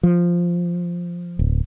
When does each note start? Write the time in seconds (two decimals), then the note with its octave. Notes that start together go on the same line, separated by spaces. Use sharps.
0.03 F3
1.39 D1